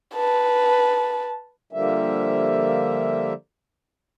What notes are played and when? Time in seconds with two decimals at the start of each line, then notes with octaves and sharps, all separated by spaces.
0.15 B4 A5
1.73 D3 F3 G3 A#3 E5